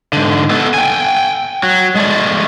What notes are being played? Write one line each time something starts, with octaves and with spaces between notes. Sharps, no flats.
G#2 D3
B3 A4
G5 G#5
F#3
G#3 A3 D5